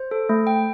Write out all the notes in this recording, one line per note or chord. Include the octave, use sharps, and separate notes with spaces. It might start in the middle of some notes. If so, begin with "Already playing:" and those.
Already playing: C5
A4
A3
G5